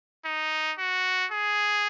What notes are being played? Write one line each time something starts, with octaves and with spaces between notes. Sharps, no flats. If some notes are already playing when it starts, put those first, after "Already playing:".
D#4
F#4
G#4